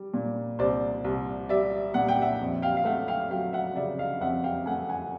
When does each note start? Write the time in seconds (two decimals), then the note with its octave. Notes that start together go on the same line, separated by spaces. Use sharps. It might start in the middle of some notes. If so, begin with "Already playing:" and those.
Already playing: G3
0.14 A#2
0.59 C2 C5 D5
1.04 C2
1.49 G3 D5 E5
1.94 A#2 F#5
2.08 G5
2.21 E5 F#5
2.40 F2
2.62 F5 G5
2.77 F5
2.85 A3 E5 F#5
3.08 F5 G5
3.31 F#3 F5 G5
3.53 E5 F#5
3.76 C#3 D5 E5
3.98 D#5 F5
4.21 F2 E5 F#5
4.44 F5 G5
4.66 A3 F#5 G#5
4.89 F#5 G#5